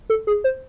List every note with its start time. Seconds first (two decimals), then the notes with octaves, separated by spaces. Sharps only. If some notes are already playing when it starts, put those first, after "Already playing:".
0.10 A4
0.27 G#4
0.44 C5